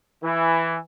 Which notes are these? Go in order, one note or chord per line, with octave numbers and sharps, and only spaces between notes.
E3